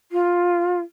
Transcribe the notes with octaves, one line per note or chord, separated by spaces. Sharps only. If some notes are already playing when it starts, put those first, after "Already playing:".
F4